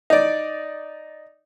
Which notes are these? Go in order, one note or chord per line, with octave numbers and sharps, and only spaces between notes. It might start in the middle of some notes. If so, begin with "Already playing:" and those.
D#4 D5